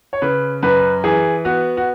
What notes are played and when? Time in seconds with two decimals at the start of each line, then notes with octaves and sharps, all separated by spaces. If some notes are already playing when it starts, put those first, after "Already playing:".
0.13 C#5
0.22 C#3 B4
0.63 F#2 B4
1.04 E3 G#4
1.45 B3 F#4
1.77 F#4